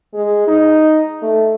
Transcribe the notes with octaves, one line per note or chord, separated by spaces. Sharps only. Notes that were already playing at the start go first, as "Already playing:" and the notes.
G#3
D#4
A3